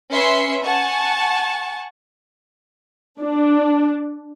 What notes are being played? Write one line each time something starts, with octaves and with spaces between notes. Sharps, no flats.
C#4 B4 E5 C6 C7 C#7
F#5 G#5 A5 C#6
D4